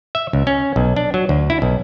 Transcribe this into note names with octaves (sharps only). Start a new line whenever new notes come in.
E5
C#2
C#4
B1
D4
F#3
D2
E4
B1